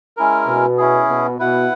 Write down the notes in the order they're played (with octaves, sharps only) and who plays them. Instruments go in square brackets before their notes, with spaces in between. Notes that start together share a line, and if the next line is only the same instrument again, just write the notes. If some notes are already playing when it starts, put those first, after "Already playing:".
[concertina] G#3 C#4 E4 A#4
[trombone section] B2
[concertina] C#4 E4 G#4
[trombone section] B2
[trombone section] B2 [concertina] E4 B4 F#5